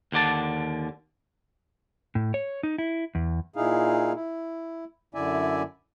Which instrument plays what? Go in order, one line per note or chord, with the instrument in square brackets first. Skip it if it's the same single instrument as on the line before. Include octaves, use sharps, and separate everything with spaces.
[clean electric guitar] D#2 D3 D5 A5
[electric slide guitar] A2
C#5
D#4
E4
E2
[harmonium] A#2 D#4 E4 G#4 F5
E4
F#2 D3 E4 D5 E5 G#5